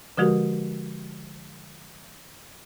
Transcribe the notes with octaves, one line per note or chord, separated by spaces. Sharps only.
D3 F3 G#3 F#4 G4 A#4